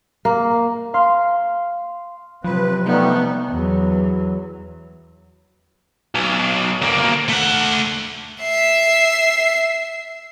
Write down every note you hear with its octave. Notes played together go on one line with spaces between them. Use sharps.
A#3
F5 C6
C3 F3 F#3 C4 B4
G3 A3 B3 D#4
E2 F#3
B1
D2 A#3
A3 F#5
E5 C7